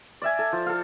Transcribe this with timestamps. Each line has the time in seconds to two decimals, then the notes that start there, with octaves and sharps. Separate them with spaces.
0.22 D5 E5 G#5
0.39 A4
0.52 F3
0.66 A4 F5